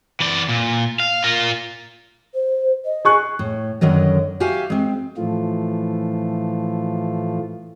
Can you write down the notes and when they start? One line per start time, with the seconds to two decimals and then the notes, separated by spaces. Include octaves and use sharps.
0.20 E3 D5
0.49 A#2
1.00 F5
1.24 F4 A#4
2.34 C5
2.85 D#5
3.05 G#4 C#6 F#6
3.39 A2
3.81 F#2 D3 D#3 F#3 D#5
4.40 F#4 G4 E5 F5 G#5
4.70 G#3 C4
5.17 A2 E3 F3 A3 F4